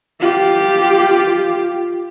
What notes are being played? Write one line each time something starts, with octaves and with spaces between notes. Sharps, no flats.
F4 G4